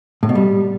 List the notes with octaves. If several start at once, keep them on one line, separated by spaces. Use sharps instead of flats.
A2
B2
G3